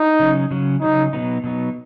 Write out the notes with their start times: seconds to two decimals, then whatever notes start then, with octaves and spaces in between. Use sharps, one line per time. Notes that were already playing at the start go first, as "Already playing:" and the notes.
Already playing: D#4
0.20 C#3 F#3 C#4
0.51 C#3 F#3 C#4
0.82 C#3 F#3 C#4 D#4
1.13 B2 F#3 B3 D#4
1.44 B2 F#3 B3 D#4